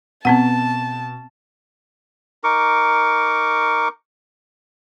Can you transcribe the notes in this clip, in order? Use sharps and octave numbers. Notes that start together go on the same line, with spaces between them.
B2 B3 C4 F#5 A5
D#4 A#4 C#6 D6